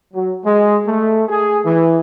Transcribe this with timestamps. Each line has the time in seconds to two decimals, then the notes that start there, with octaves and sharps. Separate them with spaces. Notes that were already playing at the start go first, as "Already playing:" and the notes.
0.14 F#3
0.44 G#3
0.86 A3
1.29 G#4
1.66 E3